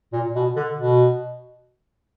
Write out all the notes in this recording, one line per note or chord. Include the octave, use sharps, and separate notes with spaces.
A#2
B2
D3
B2